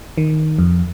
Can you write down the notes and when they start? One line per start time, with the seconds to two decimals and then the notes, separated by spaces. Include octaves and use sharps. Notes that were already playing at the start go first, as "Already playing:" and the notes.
0.18 D#3
0.59 F2